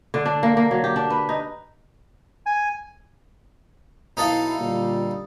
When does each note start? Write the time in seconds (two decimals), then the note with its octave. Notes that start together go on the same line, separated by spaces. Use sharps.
0.14 D3
0.26 D4
0.43 A#3
0.57 A#3
0.71 F#3
0.84 G4
0.96 D4
1.10 B4
1.29 D#4
2.46 G#5
4.17 B1 D#4 E4 A4 F5
4.59 A#2 D3 G3